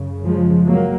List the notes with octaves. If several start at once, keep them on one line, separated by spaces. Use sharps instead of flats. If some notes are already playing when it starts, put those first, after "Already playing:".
Already playing: F#2 C#3
F3 G#3
F#3 A#3